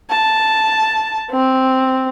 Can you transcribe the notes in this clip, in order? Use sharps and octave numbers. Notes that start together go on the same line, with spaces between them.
A5
C4